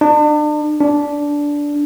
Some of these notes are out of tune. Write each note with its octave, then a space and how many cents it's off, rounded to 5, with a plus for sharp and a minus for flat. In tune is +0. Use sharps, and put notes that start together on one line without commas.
D4 +40
D4 -10